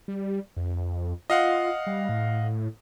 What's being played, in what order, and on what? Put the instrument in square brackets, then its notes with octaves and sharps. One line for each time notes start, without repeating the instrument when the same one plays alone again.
[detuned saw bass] G3
F2
[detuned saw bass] F4 [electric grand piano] D#5 F5 F#5
[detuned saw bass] G3
A2